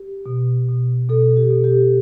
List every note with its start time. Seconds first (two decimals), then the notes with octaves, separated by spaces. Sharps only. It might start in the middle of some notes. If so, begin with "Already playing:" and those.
Already playing: G4
0.26 B2
0.68 B2
1.09 B2 A4
1.37 G4
1.50 B2
1.64 G4